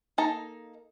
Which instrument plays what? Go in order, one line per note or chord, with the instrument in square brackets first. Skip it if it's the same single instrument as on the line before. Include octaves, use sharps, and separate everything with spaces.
[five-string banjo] A#3 D#4 A4 A5 A#5